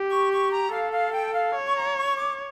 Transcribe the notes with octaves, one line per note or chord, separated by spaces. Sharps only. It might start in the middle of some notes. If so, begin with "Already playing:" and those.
Already playing: G4
C#6
C#6
A#5
A4 F5
F5
G5
F5
C#5
C#6
A#5
C#6
D6